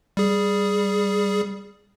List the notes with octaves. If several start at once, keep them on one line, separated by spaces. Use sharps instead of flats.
G3 G#4